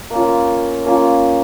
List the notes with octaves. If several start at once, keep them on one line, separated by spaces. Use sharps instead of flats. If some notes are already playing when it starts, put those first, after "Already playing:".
A#3 C#4 F4
A#3 C#4 F4